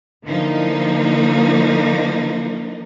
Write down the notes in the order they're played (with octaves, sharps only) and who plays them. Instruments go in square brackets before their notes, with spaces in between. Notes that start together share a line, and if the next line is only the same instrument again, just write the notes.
[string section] D3 E3 F3 A#3 D#4